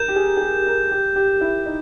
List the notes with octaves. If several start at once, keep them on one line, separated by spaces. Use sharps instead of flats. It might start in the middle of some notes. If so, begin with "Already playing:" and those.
Already playing: A#4 G6 E7
G4
G#4
G#4
G4
A#4
G4
G4
E4
D#4